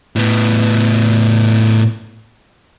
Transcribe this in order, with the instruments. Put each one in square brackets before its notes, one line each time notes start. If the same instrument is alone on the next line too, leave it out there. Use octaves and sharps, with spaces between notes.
[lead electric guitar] A2 B3